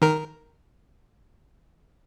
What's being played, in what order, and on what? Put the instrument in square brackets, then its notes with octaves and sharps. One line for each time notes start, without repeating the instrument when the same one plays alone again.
[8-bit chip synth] D#3 A#4